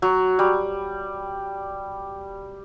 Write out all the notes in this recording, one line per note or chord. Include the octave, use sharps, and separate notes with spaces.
F#3
G3